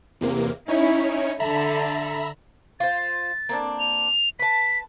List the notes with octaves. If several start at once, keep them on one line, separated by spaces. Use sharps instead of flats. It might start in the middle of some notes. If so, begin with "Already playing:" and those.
E2 C3 A#3
C#4 D#4 E4 C#5
D3 A4 E5 A#5 B5
F4 C5 A6
A#3 C4 D4
F7
B4 A5 B6